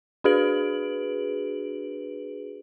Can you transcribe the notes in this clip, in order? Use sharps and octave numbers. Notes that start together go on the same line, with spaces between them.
D4 F#4 G#4 B4 D7 F#7